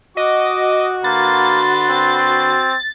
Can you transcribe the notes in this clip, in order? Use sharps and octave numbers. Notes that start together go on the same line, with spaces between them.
F#4 D#5 D6
D3 A#3 B4 C6 A6
C4